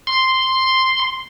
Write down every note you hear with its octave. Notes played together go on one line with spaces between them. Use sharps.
C6